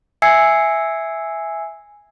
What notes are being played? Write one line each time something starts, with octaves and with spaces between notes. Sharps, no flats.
E5 G#5 E6 G#6 C7 C#7